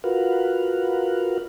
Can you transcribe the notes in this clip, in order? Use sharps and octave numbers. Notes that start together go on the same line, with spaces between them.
F4 F#4 A#4 B4 F5 F#5